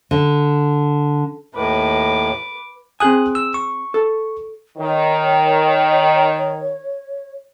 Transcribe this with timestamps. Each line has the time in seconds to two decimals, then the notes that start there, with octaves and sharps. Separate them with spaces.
0.11 D3
1.55 D#2 A2 B4 D6
3.00 C4 G#4 G#5 D#6 F#6
3.35 E6
3.54 C#6
3.94 A4
4.78 D#3 C#5